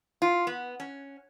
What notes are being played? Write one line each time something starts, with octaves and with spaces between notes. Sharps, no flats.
F4
B3
C#4